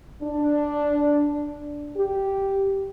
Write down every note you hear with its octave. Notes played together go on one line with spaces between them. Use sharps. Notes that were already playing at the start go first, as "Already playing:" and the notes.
D4
G4